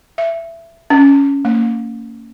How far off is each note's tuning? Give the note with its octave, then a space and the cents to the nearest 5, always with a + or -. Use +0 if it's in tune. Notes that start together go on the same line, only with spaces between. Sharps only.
E5 +20
C#4 +10
A#3 -35